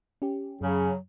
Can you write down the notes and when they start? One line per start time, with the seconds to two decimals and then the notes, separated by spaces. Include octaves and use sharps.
0.22 C#4 G4
0.61 F#2 C#3 F#3